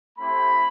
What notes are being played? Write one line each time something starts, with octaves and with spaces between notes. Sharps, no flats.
A3 C4 E4 G4 B5